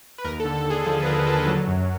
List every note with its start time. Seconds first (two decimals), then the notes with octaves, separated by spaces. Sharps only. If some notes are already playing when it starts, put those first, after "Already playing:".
0.18 B4
0.25 D#2 A#4
0.40 A4
0.45 D3
0.55 A4
0.65 D#2 G#4
0.86 F3 A4
1.02 B4
1.06 D#2 A#4
1.27 D3 A4
1.47 F#3
1.68 F#2